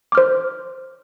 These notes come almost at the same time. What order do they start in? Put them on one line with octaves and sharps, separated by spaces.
D6 F6 C5